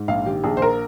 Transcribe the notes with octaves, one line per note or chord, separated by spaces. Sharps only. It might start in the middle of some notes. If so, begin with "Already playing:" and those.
Already playing: G#2
A#1 F5
D#3 G4
A#1 G#4
C5
A#4